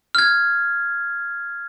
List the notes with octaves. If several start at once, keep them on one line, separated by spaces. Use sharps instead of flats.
F6 G#6